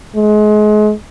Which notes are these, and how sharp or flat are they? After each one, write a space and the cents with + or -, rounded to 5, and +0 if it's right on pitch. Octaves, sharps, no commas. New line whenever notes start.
G#3 +30